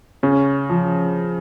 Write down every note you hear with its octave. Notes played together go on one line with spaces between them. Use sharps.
C#3 C#4
F3